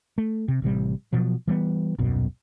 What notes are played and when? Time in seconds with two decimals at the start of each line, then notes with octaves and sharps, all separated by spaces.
0.18 A3
0.48 C3
0.62 A1 C3 E3 G3
1.13 B2 F3 F#3
1.48 E3 G3 B3
1.98 D#1 B1 F#2 B2